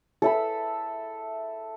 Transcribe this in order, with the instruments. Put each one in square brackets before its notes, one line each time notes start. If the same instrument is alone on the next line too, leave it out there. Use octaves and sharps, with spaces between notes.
[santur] A4 E5 B5